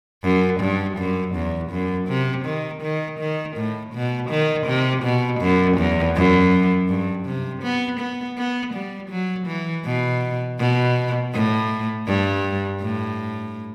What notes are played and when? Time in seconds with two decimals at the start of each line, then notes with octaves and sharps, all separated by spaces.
0.24 F#2
0.61 G2
0.98 F#2
1.35 E2
1.71 F#2
2.08 C3
2.45 D#3
2.82 D#3
3.20 D#3
3.57 A2
3.94 B2
4.30 D#3
4.67 C3
5.04 B2
5.41 F#2
5.78 E2
6.16 F#2
6.89 G2
7.26 C3
7.63 B3
8.00 B3
8.38 B3
8.74 G3
9.10 F#3
9.47 E3
9.85 B2
10.59 B2
11.33 A2
12.07 G2
12.81 A2